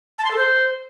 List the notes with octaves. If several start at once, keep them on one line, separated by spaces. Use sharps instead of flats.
A5
C6
A4
C5